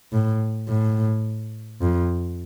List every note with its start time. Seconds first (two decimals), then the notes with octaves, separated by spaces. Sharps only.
0.12 A2
0.69 A2
1.81 F2